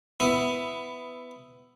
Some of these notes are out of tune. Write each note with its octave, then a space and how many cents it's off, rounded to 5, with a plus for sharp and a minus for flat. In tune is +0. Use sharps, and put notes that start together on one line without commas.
B3 +15 E4 +0